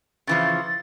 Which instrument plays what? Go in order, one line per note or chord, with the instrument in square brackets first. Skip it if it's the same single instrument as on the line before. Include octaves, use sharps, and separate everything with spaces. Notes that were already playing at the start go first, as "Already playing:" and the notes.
[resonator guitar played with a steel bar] C#3 E3 F3 [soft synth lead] A6